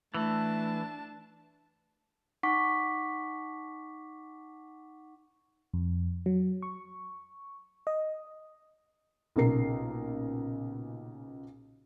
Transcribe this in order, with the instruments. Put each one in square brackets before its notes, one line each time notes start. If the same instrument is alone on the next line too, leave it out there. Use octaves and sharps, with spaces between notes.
[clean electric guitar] E3 [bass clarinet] A3 [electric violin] D4 A5
[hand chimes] D#4 F#5 C#6 D6 B6
[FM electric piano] F2
F#3
C#6
D#5
[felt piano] B1 A#2 C#3 A#4 C7